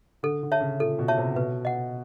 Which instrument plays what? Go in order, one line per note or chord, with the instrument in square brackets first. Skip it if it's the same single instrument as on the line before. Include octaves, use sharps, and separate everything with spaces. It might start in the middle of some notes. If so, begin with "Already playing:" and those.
[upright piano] D3 [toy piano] A4
[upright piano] D3
[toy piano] C#5 E5 A5
[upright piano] C#3
[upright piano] A#2 [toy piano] A4
[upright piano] B2
[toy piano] C#5 E5 A5
[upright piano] C3
[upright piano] B2 [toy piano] B4
[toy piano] D#5 F#5